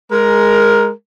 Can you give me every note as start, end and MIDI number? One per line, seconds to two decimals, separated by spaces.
0.11 0.89 56
0.11 0.89 70